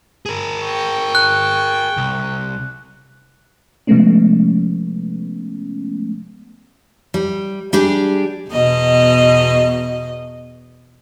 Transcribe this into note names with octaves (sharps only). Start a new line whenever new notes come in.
G#4 A#4
G5 C#6
F#6
C2
C3 F3 G#3 A3 B3 C#4
G3
G3 D4 G4 G#4
E2 B2 D#5